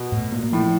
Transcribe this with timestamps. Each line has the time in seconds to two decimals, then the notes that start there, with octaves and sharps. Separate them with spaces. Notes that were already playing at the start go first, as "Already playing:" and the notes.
Already playing: B2
0.12 A2
0.32 A#3
0.52 A2 F3